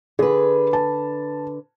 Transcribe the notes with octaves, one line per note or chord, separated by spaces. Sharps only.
D3 G#4 B4
A5